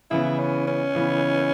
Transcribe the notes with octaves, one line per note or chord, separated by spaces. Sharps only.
C#3 E3 B3 E4
C#4
C#4
C#3 E3 B3